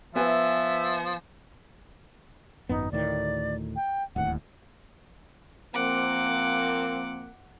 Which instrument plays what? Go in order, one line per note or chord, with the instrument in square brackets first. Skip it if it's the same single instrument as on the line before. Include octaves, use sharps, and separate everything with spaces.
[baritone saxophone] F3 [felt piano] B3 B4 G#5 [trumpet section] E5
[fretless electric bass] G#1 F#2 B3 [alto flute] D#4
[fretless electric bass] D2 A2 D#3 [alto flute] D5
[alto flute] G5
[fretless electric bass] D1 D#2 A2 [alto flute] F#5
[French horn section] F3 A#3 C4 [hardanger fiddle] F#5 D6